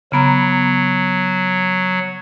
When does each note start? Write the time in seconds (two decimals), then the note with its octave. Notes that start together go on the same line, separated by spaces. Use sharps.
0.12 C#3 F#3 B3 A#5